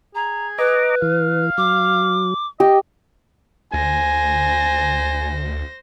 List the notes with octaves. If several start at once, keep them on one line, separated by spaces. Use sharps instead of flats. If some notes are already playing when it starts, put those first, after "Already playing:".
G#4 A#5
B4 D#5 A#5 D6
E3 F5
F#3 D6
G4 D#5
D2 C5 G#5 A#6